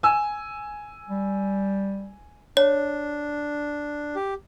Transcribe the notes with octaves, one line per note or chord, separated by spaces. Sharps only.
G#5 E6
G3
D4 C#5
G4